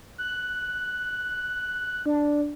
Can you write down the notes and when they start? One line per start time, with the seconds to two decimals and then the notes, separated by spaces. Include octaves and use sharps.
0.18 F#6
2.06 D4